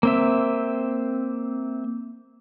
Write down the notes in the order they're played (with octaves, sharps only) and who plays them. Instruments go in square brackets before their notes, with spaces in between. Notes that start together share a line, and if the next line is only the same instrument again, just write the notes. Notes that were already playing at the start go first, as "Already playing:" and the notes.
[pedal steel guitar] A#3 C4 E5